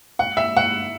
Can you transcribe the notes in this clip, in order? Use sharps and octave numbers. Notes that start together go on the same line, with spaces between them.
F#5
E5
F#5